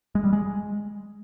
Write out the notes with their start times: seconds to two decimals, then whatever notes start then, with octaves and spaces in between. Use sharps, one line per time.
0.15 G#3
0.24 G3
0.33 G#3